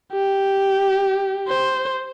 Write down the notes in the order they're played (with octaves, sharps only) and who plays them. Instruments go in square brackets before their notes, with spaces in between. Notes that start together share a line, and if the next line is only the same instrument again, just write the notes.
[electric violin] G4
C5